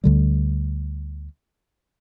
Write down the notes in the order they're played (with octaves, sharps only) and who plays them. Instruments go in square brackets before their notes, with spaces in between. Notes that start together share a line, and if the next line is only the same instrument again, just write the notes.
[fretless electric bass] D2 D3 G3